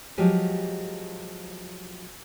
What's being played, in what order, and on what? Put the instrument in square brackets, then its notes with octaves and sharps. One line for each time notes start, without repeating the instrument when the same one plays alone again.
[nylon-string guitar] F3 F#3 G#3 G4 G#4